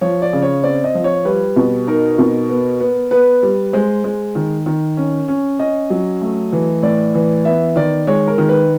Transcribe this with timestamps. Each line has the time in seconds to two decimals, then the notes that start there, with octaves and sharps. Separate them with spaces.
0.01 F3 C#5
0.22 D5
0.33 C#3
0.42 C#5
0.64 C4 D5
0.84 D#5
0.95 F3
1.04 C#5
1.25 G3 B4
1.56 B2
1.87 D#4 A#4
2.18 B2
2.49 B3
2.80 B3
3.11 B3 B4
3.43 G3
3.73 G#3 C5
4.04 G#3
4.35 D#3
4.66 D#3
4.97 C#4
5.28 C#4
5.59 C#4 D#5
5.90 F#3
6.21 A3
6.52 E3
6.83 A2 D5
7.14 E3
7.45 B3 E5
7.76 D#3 D5
8.07 G#3 C#5
8.28 A#4
8.38 D#3
8.49 B4